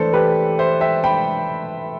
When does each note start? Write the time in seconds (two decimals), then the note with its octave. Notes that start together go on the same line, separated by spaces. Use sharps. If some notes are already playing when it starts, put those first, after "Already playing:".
Already playing: E3 A3 D4 A4 B4 C5 D5
0.13 G4 B4
0.59 C5 E5
0.81 E5 G5
1.04 G5 B5